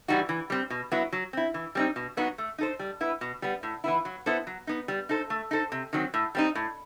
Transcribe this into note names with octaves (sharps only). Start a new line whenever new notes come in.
E3 G3 D#4 F#4
E3
G3 C4
B2
F#3 B3 E4
F#3
C4 E4
E3
G3 C4 D#4
B2
F#3 B3 D#4 F#4
A3
D#4 A4 C5
G3
B3 E4 B4
B2
G3 B3
A2
E3 B3 E4
F#3
B3 E4 A4 C5
F#3
B3 D#4
G3
D#4 A4 C5
A3
D#4 A4 C5
C3
D#3 F#3 C4
A2
G3 C4 D#4
A2